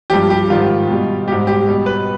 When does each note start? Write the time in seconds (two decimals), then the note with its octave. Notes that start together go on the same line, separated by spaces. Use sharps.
0.10 G2 F3 G4
0.30 G4
0.49 G#2 D#3 G3 F4
0.88 B2 G3
1.27 G#2 G3 G4
1.47 G4
1.68 B2 G3
1.86 B4